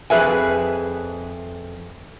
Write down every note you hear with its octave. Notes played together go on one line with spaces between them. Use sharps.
F2 G#4 B4 E5 G#5